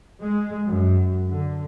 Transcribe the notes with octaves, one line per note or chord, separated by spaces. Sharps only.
G#3
F#2
D3